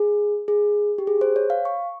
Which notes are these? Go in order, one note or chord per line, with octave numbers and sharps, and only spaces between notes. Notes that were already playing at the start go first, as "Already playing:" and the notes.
Already playing: G#4
G#4
G4
G#4
C5
C#5
F5
C#6